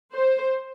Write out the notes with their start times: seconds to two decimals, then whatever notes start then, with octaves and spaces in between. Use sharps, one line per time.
0.14 C5